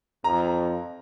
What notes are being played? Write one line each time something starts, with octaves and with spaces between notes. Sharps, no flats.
F2 A#5